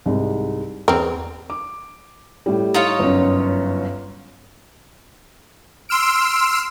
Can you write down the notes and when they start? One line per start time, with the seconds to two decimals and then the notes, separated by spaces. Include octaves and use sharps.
0.06 C2 G#2
0.88 E2 B3 C4 A#4
1.50 D6
2.46 A2 G3
2.74 D#4 F4 C#5
2.99 G1 F#2
5.89 C6 E6 F6 D7